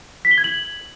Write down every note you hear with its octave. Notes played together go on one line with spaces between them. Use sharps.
B6
G7
G#6
F#7